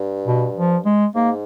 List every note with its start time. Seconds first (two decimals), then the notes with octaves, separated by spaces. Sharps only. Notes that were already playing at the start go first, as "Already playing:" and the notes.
Already playing: G2
0.27 B2
0.57 F3
0.85 G#3
1.15 G#2 A#3